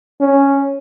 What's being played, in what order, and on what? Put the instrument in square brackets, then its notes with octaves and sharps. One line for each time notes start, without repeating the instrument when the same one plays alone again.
[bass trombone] C#4